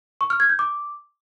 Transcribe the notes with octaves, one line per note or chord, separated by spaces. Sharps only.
C#6
F6
G#6
G6
D6